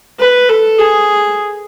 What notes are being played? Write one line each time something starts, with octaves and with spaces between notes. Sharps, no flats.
B4
A4
G#4